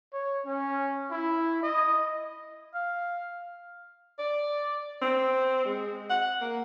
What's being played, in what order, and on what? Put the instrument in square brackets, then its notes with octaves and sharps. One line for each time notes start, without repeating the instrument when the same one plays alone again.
[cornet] C#5
C#4
E4
D#5
[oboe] F5
[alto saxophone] D5
C4
G#3
F#5
A#3